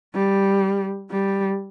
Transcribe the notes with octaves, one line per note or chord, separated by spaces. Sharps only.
G3
G3